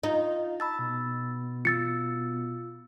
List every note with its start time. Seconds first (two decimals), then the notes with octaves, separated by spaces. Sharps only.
0.03 D#4 F4 D#5
0.60 A5 B5 E6 A6
0.79 B2
1.65 F4 E6 A6 C#7